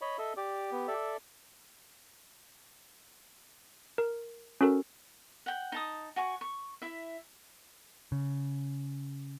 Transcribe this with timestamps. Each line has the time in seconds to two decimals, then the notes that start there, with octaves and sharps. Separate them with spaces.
0.01 C#5 D#5 B5
0.18 A4 D#5 E5
0.37 G4 D5 D6
0.72 B3
0.88 A4 D5 E5
3.98 A#4
4.61 C#4 F#4 A4 A#4
5.46 F#5 G5
5.72 D#4 A5 D#6
6.16 F#4 G#5 C#6
6.41 C#6
6.82 E4 E5
8.12 C#3